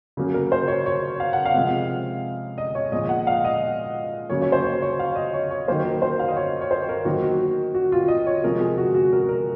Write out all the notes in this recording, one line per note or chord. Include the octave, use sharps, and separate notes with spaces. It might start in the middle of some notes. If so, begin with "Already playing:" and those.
C#3 F#3 A#3
A#4
C5
C#5
C#5
F5
F#5
F5
C3 F3 G#3
D#5
C#5
A#2 F3 G#3 D#5
F#5
F5
D#5
C#3 F#3 A#3 C#5
C#5
C5
C#5
C#5
F5
D#5
C#5
C#5
D#3 F#3 A#3 C5
A#4
C5
F5
D#5
C#5
C#5
C5
A#4
D#3 F#3 A#3 F#4
F#4
F#4
F4
D#5
C#5
C3 F3 G#3 A#4
G#4
F#4
F#4
A#4
A#4